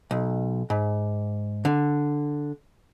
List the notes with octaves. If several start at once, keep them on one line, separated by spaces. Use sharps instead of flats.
B1
G#2
D3